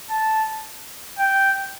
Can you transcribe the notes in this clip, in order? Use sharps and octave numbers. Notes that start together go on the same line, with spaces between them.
A5
G5